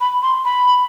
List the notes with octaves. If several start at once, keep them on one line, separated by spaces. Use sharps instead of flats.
B5
C6
B5